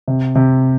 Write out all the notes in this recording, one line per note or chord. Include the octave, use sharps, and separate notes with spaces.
C3
C3